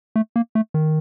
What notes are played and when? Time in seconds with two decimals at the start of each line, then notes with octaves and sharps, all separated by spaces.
0.16 A3
0.36 A#3
0.55 A3
0.74 D#3